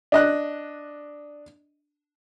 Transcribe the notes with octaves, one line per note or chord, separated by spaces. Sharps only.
D4 D#5 F#6